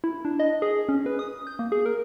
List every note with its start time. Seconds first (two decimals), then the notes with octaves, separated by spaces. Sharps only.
0.04 E4
0.25 D4
0.39 D#5
0.62 G#4
0.89 C#4
1.06 B4
1.19 D#6
1.47 G6
1.59 A#3
1.72 G#4
1.86 A#4